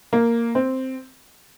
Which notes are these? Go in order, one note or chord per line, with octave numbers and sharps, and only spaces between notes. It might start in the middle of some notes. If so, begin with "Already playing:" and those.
A#3
C4